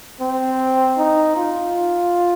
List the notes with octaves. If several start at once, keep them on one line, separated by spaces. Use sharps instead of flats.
C4
D#4
F4